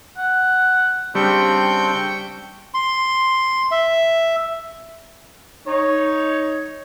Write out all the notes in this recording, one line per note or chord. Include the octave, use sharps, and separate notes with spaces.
F#5
C#3 G3 C4 D4 G5 C#6 G6
C6
E5
D#4 C#5